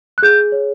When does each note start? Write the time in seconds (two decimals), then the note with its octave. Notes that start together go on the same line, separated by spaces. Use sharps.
0.18 F#6
0.23 G#4 G6
0.52 C#5